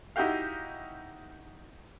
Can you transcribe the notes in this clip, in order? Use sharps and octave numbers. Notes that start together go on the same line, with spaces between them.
D#4 E4 F#4 G4 F5